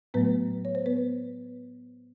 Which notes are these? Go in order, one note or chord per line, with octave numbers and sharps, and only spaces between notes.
A2 F#3 A3 B3 B4
C#5
C5
B3 B4